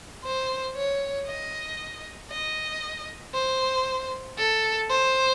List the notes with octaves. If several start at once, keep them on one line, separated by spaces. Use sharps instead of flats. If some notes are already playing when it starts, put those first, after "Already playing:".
C5
C#5
D#5
D#5
C5
A4
C5